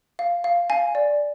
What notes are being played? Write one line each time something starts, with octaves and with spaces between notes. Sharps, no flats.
F5
F5
F5 G#5
D5